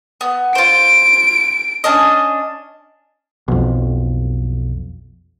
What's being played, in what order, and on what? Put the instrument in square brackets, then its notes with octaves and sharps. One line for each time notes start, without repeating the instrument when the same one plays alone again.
[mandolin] B3
[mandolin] F4 C5 [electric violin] D7
[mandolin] C#4 D4 D#5
[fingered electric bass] B1 F2